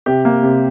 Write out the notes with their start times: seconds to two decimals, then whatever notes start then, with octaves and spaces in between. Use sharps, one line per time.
0.06 C3 G4
0.25 A#3
0.43 C3